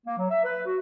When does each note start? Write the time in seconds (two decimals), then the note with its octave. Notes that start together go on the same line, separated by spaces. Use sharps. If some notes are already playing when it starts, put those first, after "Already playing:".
0.07 A#3
0.18 F#3
0.30 E5
0.44 B4
0.66 F#4